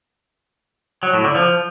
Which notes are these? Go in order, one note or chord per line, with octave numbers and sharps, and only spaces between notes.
F#3
A2
D3
F3